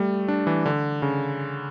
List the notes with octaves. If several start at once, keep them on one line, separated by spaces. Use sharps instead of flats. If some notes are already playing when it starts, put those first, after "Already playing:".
Already playing: G3 A3
D4
E3
D3
C#3